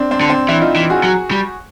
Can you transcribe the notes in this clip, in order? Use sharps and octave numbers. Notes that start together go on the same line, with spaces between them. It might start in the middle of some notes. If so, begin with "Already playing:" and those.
Already playing: C4 D4
C4 D4
D3
C4 D4
E3 D4 E4
D#4 F4
E3
F#4 G#4
F#3
G3